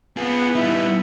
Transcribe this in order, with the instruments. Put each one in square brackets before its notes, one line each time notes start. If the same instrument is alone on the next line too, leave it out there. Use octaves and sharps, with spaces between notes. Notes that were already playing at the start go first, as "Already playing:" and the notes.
[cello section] B3 [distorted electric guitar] F4 G#4
[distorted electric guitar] G3 D#4 [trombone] E4